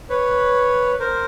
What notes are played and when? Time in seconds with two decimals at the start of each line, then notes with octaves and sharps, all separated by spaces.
0.10 B4 C#5
1.00 A#4 C5